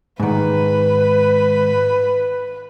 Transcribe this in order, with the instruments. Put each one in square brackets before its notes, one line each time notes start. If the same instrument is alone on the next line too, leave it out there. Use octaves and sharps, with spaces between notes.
[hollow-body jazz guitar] G#2 D#3 [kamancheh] B4